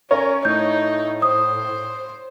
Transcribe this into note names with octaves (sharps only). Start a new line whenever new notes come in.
C#4 A#4 C#5
A2 D#4 G6
C5 D#6